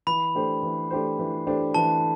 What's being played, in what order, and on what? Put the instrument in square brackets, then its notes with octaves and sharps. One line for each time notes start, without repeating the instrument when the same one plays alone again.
[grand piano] E3 [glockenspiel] B5
[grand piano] A3 D4 G4 C5
E3
A3 D4 G4 C5
E3
A3 D4 G4 C5
[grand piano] E3 [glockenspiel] A5